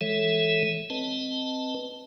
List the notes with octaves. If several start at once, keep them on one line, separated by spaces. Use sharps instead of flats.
E3 G#3 A4 C#5 E5
C4 B4 D#5 A5